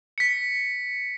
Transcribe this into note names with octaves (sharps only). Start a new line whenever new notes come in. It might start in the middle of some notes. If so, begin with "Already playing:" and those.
B6 C#7